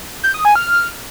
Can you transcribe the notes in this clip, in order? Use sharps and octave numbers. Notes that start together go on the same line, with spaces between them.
G6
D#6
G#5
F6